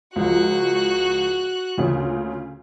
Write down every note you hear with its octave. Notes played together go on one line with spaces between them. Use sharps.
C#2 F3 F#4 F#6
D2 A#2 C#3